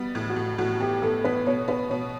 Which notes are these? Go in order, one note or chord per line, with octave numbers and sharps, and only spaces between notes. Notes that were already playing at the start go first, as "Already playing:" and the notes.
Already playing: G3 B3
A2
F#4
A2
A2 F#4
B3 G4
B3 A4
B3 B4
B2 C#5
B3 B4
B2 C#5